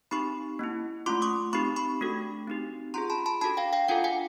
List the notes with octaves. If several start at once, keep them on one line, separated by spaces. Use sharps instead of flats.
C4 D#4 G4 B5 C#6
A#3 C#4 E4
A3 C#4 F4 C6 D6
C#6 D#6
C4 D#4 G4 B5 C#6
B5 C#6
A3 D4 F#4 A4
C4 D#4 G4
C#4 F4 G#4 A#5 C6
A5 B5
A5 B5
D4 F#4 A4 A5 B5
F5 G5
F5 G5
D4 F4 A4 F#5 G#5
F#5 G#5